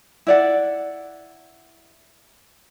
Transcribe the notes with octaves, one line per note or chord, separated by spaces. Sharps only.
E4 D5 F#5